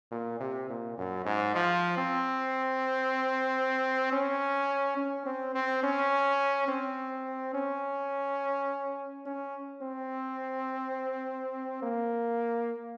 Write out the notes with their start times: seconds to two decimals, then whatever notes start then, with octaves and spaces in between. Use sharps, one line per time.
0.11 A#2
0.40 C3
0.70 A#2
0.98 F#2
1.26 G#2
1.55 F3
1.97 C4
4.12 C#4
4.97 C#4
5.26 C4
5.55 C4
5.83 C#4
6.68 C4
7.54 C#4
9.26 C#4
9.82 C4
11.82 A#3